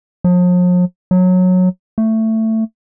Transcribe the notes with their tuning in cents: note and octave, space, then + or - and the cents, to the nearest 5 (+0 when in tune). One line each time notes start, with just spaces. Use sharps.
F3 +45
F#3 -15
A3 +15